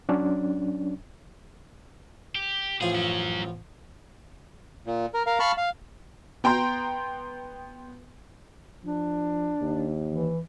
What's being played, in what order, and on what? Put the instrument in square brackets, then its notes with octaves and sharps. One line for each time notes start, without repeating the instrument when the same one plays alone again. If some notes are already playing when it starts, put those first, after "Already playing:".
[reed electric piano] F#3 C#4 D4
[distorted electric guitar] G4
[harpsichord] A1 F3 F4 [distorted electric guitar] G#4
[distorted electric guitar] F#3 C#4
[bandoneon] A#2
A#4
A#4 F5
F5 A5 B5 C#6 F6
F5
[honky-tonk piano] B3 G5 A#5 C6 G6
[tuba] F3 [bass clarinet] D4
[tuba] D#2
[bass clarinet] E3